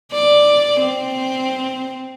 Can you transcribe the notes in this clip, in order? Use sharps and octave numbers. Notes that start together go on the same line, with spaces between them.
D5
C4